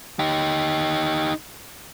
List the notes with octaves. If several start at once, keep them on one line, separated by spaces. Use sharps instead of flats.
D#4 G4